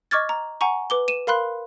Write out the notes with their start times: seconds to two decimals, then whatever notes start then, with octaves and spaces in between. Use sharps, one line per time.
0.11 D#5 C#6 D6 F6 G#6 A6
0.29 A#5
0.61 F#5 G#5 A#5 C#6
0.90 B4 D6 G7
1.08 D#7 E7
1.27 A#4 F5 B5 C6 F#6